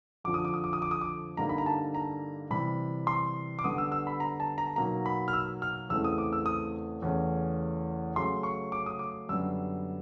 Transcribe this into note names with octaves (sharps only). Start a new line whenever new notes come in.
F2 D3 F3 D6
D#6
D6
D#6
D6
D#6
D6
D#6
D6
G2 D3 G3 A#3 D#4 A#5
B5
A#5
A5
A#5
C3 E3 G3 B5
C6
D6
D3 G3 B3 D#6
E6
E6
B5
A#5
A5
A#5
B2 F#3 A#3 D#4 A#5
B5
F6
E6
F6
E2 C#3 E3 A3 C4 E6
D#6
D6
E6
D#6
E2 C#3 E3 A3 C#4
C#3 F#3 A3 C#4 C6
C#6
D6
D#6
D6
F#2 D3 G3 B3 E6